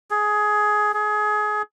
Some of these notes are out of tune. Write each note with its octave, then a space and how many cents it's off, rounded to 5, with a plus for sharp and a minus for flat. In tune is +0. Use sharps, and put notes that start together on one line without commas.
G#4 +15
G#4 +25